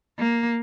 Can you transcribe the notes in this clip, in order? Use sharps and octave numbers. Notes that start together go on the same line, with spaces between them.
A#3